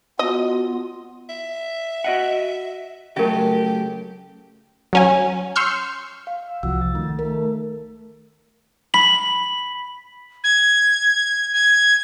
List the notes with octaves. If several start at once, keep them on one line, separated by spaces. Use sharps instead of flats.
B3 F4 F#4 D#5
E5
F#4 D#5 F#5
C#3 F#3 A3 G4 A#4 E5
F#3 C#4 G#5
C6 C#6 E6 F6 G6
F5
E6
C2 F3 F#4 E6
A6
D#3 A3
A3 A#4
B5 B6 F#7
G#6
G#6